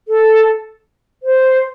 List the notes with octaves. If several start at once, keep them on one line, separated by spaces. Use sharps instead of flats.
A4
C5